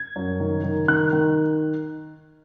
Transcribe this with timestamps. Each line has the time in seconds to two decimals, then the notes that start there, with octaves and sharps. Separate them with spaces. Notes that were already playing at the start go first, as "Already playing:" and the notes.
Already playing: G#6
0.16 F#2
0.40 D#3
0.64 D#3
0.88 D#3 F#6
1.13 D#3